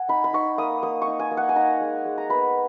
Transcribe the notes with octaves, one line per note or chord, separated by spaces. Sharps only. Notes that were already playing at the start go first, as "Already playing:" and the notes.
Already playing: F#5 G#5
D#4 B5
B5
D#4 C#6
A#3 D#6
A#3 D#6
C#6
D#4
G#5
A#3
F#5
G#5
D#4 A#5
G#3
G#3
A#5
B3 B5